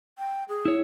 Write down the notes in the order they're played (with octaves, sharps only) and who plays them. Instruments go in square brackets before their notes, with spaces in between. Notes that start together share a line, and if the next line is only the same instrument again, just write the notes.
[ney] G5
G#4
[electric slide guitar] E4 C#5